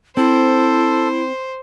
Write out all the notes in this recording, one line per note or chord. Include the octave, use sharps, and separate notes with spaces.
C4 E4 A4 C5